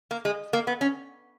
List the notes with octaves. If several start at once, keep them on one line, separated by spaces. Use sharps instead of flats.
A#3
G#3
A#3
B3
C#4